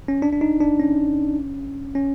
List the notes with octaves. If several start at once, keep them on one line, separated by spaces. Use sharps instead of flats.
C#4
D4
D4
D#4
D4
C#4
C#4